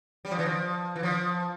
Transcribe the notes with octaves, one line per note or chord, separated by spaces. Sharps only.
G3
F3
E3
F3
E3
F3